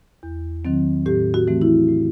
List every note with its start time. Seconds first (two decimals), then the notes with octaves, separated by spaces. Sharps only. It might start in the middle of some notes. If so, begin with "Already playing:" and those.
0.23 E2
0.65 D#3 F#3 C4
1.06 A2 G4
1.34 F#4
1.47 E3 A3 C4
1.62 E4
1.89 A2